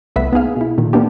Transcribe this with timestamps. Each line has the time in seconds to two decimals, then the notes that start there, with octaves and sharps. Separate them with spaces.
0.16 C2 A3 B3 B4 E5 B6
0.33 B3 D#4 G#4 F5
0.56 B2 E4
0.78 A#2 D#3
0.93 A#3 B3 D4 G4